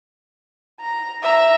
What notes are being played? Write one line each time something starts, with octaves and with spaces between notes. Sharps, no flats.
A#5
E5 A#5